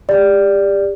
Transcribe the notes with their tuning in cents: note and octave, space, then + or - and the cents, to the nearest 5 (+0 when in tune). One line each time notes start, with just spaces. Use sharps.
G4 +35 D5 +0